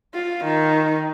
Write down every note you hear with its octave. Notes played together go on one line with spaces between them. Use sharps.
F4
D#3